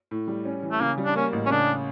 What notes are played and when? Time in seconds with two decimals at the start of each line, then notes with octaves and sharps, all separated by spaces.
0.11 A2
0.28 G3
0.45 C#4
0.63 E3
0.71 A3
0.81 C#3 A#3
0.98 G3
1.05 D4
1.15 A#3 C#4
1.33 A1
1.46 C#4
1.50 C#3 D4